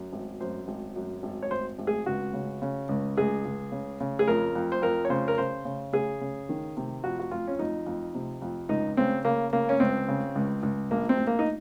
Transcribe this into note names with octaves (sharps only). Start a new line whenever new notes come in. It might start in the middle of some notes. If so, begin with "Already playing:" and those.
Already playing: F#2
G#1
F#2 C5
G#1
F#2
G#1
C#5
G#1 C5
G#1
G#4
C#2 F#4
C#3
C#3
C#2
C#2 G#4
C#2
C#3
C#3
G#4
F2 A#4
F2
C5
F2 A#4
C#5
C#3 C5
A#4
C#3 C5
C#3
C#3 G#4
C#3
D#3
C3
F2 F#4
F#4
F2 F4
C#4
F2 D#4
F2
C3
F2
C#2 D#4
C#3 C4
C#3 A#3
C#3 A#3
C#4
C#2 C4
C#3
C#2
C#2
A#1 A#3
C4
A#1
A#3
D#4